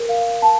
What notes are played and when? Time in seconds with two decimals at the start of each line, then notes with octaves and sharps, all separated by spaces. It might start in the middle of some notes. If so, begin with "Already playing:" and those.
Already playing: A#4
0.09 F5
0.42 A5